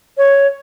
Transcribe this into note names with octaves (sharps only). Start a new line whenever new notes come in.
C#5